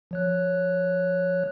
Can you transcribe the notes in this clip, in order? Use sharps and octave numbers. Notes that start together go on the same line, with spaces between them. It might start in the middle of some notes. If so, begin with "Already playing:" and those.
F3 C#5 F#6